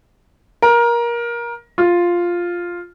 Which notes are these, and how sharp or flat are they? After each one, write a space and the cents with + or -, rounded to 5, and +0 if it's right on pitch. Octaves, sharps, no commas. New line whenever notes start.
A#4 +20
F4 +0